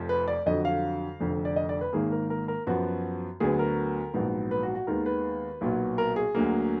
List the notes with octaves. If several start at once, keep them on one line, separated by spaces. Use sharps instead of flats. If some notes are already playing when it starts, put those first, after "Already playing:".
Already playing: F1 F2 F3
B4
D5
F2 D3 F#3 D#5
F5
F1 F2 D3
D5
D#5
D5
B4
G#1 G#2 D#3 A#3 G#4
A#4
A#4
A#4
F#2 F3 B3 F#4
D2 D3 F#3 B3 G#4
A#4
A#1 G#2 F#3 B3
B4
F#4
F#4
D#2 D#3 G#3 B3 A#4
B4
B1 A#2 F#3 B3
A#4
G#4
D2 D3 F#3 A#3